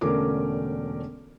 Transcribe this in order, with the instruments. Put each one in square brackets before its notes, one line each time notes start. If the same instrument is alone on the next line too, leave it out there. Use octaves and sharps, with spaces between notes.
[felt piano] E1 D3 A3 C#4 A#4 D6